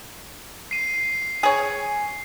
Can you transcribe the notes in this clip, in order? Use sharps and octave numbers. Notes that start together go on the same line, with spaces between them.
C7 D#7
G#4 C#5